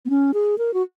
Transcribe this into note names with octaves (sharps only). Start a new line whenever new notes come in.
B3
C#4
G#4
A#4
F#4